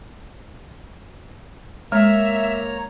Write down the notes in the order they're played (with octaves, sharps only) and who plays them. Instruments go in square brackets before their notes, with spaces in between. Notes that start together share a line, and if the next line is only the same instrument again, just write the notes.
[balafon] G#3 [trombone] A#3 [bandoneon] C#5 A#5 [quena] E5